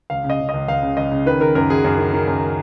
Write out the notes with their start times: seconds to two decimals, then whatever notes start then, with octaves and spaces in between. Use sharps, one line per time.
0.10 C#2 F5
0.24 C#3
0.30 D#5
0.40 C#3
0.49 D#5
0.54 C#2
0.68 C#2 F5
0.83 C#3
0.97 C#2 D#5
1.11 C#3
1.26 D#3 B4
1.40 D#3 A#4
1.55 F#2 A#4
1.70 F#2 G#4
1.84 F#2
1.98 D#3
2.13 D#3
2.27 F#2